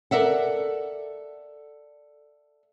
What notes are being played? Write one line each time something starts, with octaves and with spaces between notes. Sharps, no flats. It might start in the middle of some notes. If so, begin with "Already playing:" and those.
A4 A#4 D5 E5 F#5